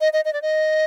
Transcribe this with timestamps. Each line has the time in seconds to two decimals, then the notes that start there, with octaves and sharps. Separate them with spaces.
0.01 D#5
0.13 D#5
0.25 D#5
0.33 D5
0.42 D#5